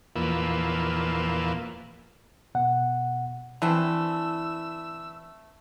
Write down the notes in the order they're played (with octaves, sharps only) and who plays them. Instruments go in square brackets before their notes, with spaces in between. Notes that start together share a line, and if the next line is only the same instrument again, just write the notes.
[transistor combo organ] E2 A#2 F3 A#3 B4 E6
[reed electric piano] B2 F#5
[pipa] D3 A3 C4 [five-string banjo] E3 [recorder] E6